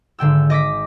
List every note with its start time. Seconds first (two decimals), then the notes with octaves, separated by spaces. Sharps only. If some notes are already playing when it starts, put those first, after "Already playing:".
0.19 G#1 D3 G5 E6
0.50 D#5 D6 A#6 B6